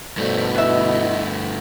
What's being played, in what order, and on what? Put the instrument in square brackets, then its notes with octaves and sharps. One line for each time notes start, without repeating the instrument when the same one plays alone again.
[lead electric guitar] G2 A3 [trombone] B2 [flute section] A4 C5 D5
[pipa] B3 E5 [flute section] E4 D#5